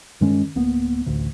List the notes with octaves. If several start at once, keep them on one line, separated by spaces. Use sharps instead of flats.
G2 D#3 G#3 C#4
D1 A#3 B3
A1 D2